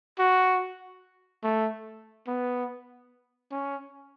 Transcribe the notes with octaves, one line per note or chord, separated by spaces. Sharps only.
F#4
A3
B3
C#4